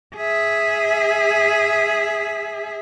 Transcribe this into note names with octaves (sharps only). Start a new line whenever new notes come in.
G#4 E5